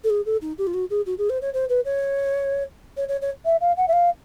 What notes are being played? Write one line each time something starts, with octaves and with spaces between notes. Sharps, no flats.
A4
G#4
A4
D#4
G4
F4
F#4
G#4
F#4
G#4
C5
C#5
C5
B4
C#5
C#5
C#5
C#5
E5
F5
F#5
E5
F5